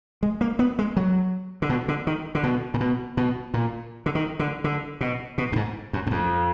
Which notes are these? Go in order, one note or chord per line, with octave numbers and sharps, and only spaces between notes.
G#3
A#3
B3
G#3
F#3
D3
B2
D3
D#3
D3
B2
A#2
B2
B2
A#2
D3
D#3
D3
D3
B2
B2
F#2
G#2
F#2
F#2
F2